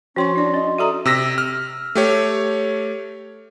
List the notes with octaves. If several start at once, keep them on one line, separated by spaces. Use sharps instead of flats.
F3 C#4 F#4 C#5 G5 C6 C#6
D4 E4 D5
C#4 D#5
F#4 A4 D5 E5 A#5 D#6
C3 E6 A#6 B6
F6
A3 G4 C#5